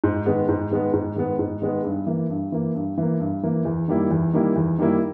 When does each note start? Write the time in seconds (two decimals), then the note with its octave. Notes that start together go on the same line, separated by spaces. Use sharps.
0.04 G#2
0.26 D#3 G#3 B3
0.49 G#2
0.71 D#3 G#3 B3
0.94 G#2
1.16 D#3 G#3 B3
1.39 G#2
1.62 D#3 G#3 B3
1.84 G2
2.07 E3 A#3
2.30 G2
2.52 E3 A#3
2.75 G2
2.98 E3 A#3
3.20 G2
3.43 E3 A#3
3.65 E2
3.88 D#3 G3 A#3 E4
4.11 E2
4.34 D#3 G3 A#3 E4
4.56 E2
4.78 D#3 G3 A#3 E4